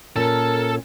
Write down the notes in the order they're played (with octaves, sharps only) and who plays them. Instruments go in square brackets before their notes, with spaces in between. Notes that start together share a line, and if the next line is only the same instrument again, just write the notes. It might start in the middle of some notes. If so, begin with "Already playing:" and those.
[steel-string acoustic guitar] A#2 C#4 [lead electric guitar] A4 A5 [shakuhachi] A#4